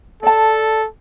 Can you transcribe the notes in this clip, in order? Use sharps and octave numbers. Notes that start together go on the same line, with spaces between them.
A4 D5 A5